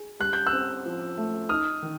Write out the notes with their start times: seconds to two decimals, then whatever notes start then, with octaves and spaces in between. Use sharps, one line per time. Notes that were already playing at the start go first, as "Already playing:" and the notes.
Already playing: G#4
0.20 G3 F#6
0.33 G6
0.47 E6 F#6
0.53 C4
0.85 F3
1.18 A3
1.49 D#4 D#6 F6
1.82 D#3